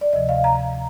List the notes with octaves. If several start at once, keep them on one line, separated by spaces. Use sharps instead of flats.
D5
D2 C3 F3 D#5
F5
A#5